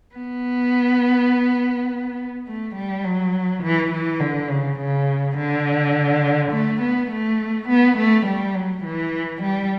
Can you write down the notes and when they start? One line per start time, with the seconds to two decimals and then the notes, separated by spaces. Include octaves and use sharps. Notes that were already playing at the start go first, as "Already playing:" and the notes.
0.15 B3
2.47 A3
2.75 G3
3.04 F#3
3.63 E3
3.92 E3
4.20 D3
4.49 C#3
4.79 C#3
5.37 D3
6.52 A3
6.81 B3
7.11 A3
7.68 B3
7.97 A3
8.26 G3
8.55 F#3
8.84 E3
9.42 G3